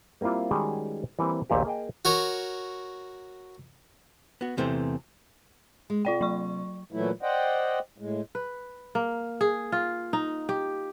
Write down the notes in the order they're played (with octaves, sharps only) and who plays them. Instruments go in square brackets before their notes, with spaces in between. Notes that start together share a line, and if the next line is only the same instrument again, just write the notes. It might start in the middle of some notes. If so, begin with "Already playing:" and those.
[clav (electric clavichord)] G3 A#3 C4 E4 F4
D#3 G3 G#3 C#4 F#4 G#4
E3 G3 A#3 C4
A#1 D#2 A#2 A3 G4
A#3 G#4 D#5 G5
[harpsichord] F#4 A#4 C#5
[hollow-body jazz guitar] B3 F#4
E2 C3 E3 A3 C5
[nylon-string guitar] G#3
[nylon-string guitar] C3 [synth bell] F4 D5 G5
[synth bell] F#3 C#6
[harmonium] A#2 E3 F#3 A3 E4
C5 D5 D#5 F#5 G5
A2 G#3
[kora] B4
A#3
G#4
F4
D#4
G4